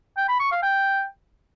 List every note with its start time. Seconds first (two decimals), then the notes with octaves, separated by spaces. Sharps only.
0.17 G5
0.29 B5
0.40 C#6
0.51 F5
0.63 G5